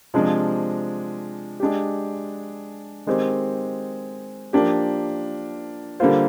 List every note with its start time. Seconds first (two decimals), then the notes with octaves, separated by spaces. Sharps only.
0.14 C3 F3 G#3 D4
1.60 G#3 D4 G4
3.07 D#3 G#3 C4 G4
4.53 F3 A#3 D4 G4
6.00 D3 G3 A#3 F4 C5